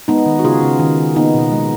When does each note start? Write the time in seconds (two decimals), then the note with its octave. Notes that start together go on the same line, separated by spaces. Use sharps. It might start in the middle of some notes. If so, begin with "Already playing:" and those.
0.08 G#3 B3 D#4
0.26 D#3
0.39 F#4
0.44 C#3 F4 G#4
0.63 C#3
0.80 D#3
0.98 D#3
1.16 A#3 B3 D#4
1.34 B2
1.52 G#3